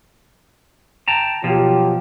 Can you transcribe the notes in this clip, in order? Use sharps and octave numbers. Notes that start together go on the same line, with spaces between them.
G5 A5 A#5
B2 F3 F#3 F4 G4